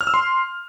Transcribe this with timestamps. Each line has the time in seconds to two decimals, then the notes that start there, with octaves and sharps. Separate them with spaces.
0.01 F6
0.07 E6
0.14 C6